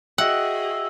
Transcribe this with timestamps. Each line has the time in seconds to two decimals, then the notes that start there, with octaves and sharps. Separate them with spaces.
0.18 F#4 G#4 D#5 E5 F#5 G5 E6